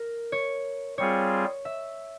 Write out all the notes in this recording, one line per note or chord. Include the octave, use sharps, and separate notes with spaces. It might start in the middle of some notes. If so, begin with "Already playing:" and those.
Already playing: A#4
C#5
G3 C4 F4 G#4 C#5
E5